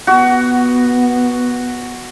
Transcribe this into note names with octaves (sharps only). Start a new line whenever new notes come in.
B3 F#4